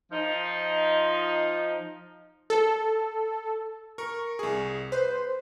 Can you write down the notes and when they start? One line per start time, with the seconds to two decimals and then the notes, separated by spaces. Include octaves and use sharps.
0.12 F3 D#4
2.50 A4
3.98 A#4 C#6
4.39 C2 G#4
4.92 B4 C5